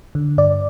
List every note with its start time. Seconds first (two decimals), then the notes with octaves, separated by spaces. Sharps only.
0.15 D3
0.38 G2 D5